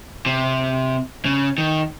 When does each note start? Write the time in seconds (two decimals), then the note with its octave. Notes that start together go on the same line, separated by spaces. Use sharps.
0.26 C3
1.25 C#3
1.58 D#3